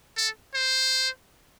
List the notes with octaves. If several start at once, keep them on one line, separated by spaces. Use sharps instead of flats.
A4
C5